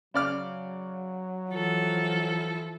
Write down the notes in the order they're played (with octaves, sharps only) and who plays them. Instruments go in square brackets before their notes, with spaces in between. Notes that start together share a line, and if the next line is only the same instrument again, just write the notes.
[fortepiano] C#3 D5 F6 [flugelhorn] F#3
[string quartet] E3 F3 A4